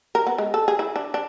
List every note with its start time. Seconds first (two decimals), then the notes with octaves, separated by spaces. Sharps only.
0.15 A#4
0.27 B3
0.38 G#3
0.54 A4
0.68 G#4
0.79 E4
0.96 D4
1.14 D4